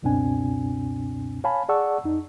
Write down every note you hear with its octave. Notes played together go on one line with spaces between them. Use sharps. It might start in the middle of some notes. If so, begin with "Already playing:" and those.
C#2 F#2 B2 C4 D4 G#5
C#5 F5 G#5 A5 B5
G#4 D5 F#5 A5 C#6 E6
F2 D#4